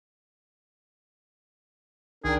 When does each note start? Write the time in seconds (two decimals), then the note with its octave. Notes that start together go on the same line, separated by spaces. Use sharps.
2.24 C2 D#3 D4 G#4 A#4 G5